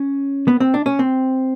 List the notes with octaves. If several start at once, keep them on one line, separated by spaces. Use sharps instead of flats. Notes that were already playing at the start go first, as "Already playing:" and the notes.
Already playing: C#4
B3
C4
D4
C#4
C4